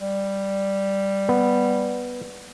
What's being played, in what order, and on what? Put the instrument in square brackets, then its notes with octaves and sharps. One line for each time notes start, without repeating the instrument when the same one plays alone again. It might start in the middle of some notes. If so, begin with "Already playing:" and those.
[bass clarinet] G3
[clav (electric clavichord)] B3